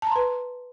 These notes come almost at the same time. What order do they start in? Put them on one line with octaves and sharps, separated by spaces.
A5 A#5 C6 B4